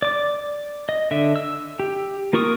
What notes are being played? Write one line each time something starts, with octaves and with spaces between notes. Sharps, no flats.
D5 D6
D#5
D3 E5
E6
G4
A#3 F4 A#4 C#6 D#6